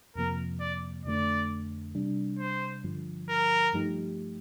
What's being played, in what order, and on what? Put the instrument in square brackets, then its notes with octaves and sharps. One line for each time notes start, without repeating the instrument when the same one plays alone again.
[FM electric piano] F2 C3 F3 A#3 [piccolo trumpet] A#4
[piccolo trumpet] D5
[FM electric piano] F2 D3 A3 D4 [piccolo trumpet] D5
[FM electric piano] C3 G3 D4
[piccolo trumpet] C5
[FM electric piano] G2 D3 F3
[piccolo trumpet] A#4
[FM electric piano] G2 F3 A3 D#4 G4